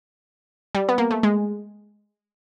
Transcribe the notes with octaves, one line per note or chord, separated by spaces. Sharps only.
G3
B3
A#3
A3
G#3